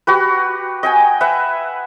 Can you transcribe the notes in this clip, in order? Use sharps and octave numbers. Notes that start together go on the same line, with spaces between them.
F#4 G4 B4
D#5 G5 G#5
B4 E5 F#5